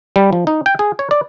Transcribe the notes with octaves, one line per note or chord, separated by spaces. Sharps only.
G3
F3
D#4
G5
G#4
C#5
D5